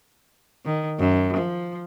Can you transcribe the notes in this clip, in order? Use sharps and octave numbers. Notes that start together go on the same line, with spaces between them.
D#3
F#2
F3